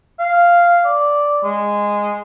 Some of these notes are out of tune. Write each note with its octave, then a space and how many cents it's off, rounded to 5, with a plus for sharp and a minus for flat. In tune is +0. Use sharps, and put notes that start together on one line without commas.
F5 -5
D5 -5
G#3 -10